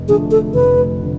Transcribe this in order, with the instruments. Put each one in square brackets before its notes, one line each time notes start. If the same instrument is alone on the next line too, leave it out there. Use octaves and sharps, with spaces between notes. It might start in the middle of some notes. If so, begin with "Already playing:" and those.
Already playing: [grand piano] F1
[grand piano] F2 D3 A3 D4 [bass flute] G#4
[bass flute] A4
[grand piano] F1 [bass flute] B4
[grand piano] D3